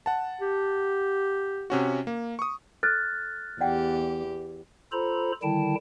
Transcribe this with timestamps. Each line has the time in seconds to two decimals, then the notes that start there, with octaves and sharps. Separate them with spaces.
0.06 F#5 A5
0.41 G4
1.70 C3 C#4 F#4
2.07 A#3
2.39 C#6 D#6
2.83 A4 F6 F#6 A6
3.61 E2 G4 D5 F#5 G5
4.92 F4 A4 C5 A#5 B5
5.43 D3 D#3 G3 E4 G5 A5